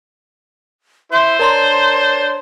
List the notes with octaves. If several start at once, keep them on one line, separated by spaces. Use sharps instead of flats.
E4 C5 E5 C6
D4 A#4 C#5 A5 A#5 C6